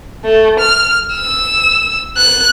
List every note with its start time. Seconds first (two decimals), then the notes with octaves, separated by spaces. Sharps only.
0.24 A3
0.60 F6
1.13 E6
2.18 F#6